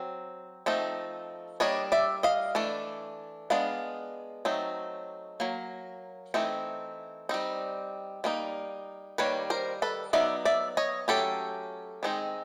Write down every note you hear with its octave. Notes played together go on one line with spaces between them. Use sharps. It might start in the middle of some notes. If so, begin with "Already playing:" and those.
Already playing: F#3 C4
F3 A3 C4 D#4
G3 A#3 D4 C#5 D#5
D5 E5
D#5 F5
E3 A3 D4
G#3 B3 D4 F5
F#3 A3 C4 D#4
F#3 A#3
E3 A3 C4 D#4
G3 C4 D#4
G3 A#3 D#4
D#3 G3 A#3 B4 C#5
A#4 C5
A4 B4
F#3 B3 D#4 D5 E5
D5 E5
C#5 D#5
F#3 A3 C#4 G4 A4
D#3 G#3 C4 D#4